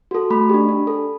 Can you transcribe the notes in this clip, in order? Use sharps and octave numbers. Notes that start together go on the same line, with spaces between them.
F#4 A4
A3 B5
D4 G4
D4
A4